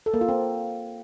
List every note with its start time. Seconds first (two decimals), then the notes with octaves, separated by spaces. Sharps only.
0.06 A4
0.14 A#3
0.21 F4
0.29 C4